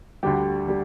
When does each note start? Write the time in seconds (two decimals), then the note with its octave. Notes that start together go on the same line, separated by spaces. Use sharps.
0.23 D2 D3 G3 G4
0.68 G3